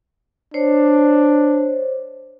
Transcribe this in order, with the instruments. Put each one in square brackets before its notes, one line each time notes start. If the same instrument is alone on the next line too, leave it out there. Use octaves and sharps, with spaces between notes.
[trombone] D4 [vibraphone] C5 C#5